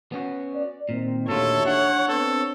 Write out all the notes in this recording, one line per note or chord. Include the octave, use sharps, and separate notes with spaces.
B3 C#4 F#4
D5
A#2 D#3 C4
D#2 A#2 D3 A3 F4 F#4 A4 C#5
D4 F#5
B3 C4 A4